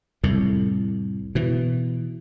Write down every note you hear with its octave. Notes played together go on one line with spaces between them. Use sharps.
C2 F2 A2
B2 E3